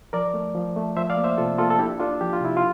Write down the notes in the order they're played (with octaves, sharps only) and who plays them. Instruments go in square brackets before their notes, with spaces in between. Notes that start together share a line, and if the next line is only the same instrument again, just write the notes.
[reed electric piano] F3 A#4 D5
A3
F3
A3
F3 C5 E5
D5 F5
A#3
C5 E5
C3 F4 A4
A#3 F4 A4
A4
D4 E4 G4
D4 F4 A4
F3 G4
F4
C3 E4
F4